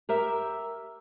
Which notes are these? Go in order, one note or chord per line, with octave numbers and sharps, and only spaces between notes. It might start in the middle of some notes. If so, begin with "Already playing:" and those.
G4 A#4 E5